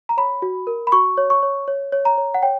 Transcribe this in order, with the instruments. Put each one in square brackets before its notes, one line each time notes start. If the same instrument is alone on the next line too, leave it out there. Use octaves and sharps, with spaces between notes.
[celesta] A#5
C#5 B5
F#4
A#4
B5
F#4 C#6
C#5
C#6
C#5
C#5
C#5
A#5
C#5
F#5
C#5 G5